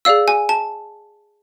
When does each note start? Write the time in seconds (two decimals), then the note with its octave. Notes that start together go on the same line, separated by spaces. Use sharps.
0.05 G#4 D5 F5 E6
0.28 G#5
0.49 A5